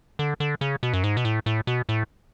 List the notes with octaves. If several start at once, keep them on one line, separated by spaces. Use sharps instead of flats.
D3
D3
C#3
B2
F#2
G#2
B2
A2
A2
B2
A2